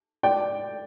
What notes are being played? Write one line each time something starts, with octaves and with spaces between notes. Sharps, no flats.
D5 G5